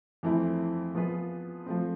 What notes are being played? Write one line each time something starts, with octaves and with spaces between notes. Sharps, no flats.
F2 E3 A3 C4 E4
F3 B3 F4 G#4 B4
F3 A3 C4